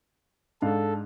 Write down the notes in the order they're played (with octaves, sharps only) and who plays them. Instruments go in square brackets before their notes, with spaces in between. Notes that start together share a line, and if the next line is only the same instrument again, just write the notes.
[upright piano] G#2 D4 F5 [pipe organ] A4